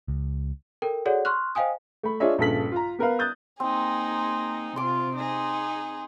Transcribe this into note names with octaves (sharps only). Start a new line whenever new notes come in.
C#2
A4 A#4 G5
F#4 G#4 A4 C#5 D5 F#5
C6 C#6 F6 F#6
C5 D#5 F5 G5 G#5 D#6
A3 B5
D4 F4 G#4 C#5 D#5 E5
A#1 G2 C#3 A4 B6 F#7
F4 A#5
B3 A#4 B4 F5
D#6 F#6 G6 A6
A#3 C4 D#4 G#4
C3 F4 C6 D6
D#4 G#4